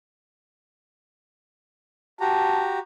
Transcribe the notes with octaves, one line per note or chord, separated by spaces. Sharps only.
F#4 G4 A5 A#5